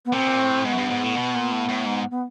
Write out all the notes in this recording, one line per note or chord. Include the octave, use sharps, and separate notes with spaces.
B3
A#2 C4
B2
A#2
A2
G#2 B3
F#2
G2
G#2
A2
B2
A#2
A2
A2
G#2
B3